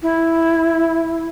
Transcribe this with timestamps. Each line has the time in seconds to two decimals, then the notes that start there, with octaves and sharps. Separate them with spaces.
0.02 E4